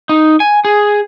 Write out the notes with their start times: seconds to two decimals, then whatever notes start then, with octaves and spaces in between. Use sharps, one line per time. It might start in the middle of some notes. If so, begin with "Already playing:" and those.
0.09 D#4
0.40 G#5
0.65 G#4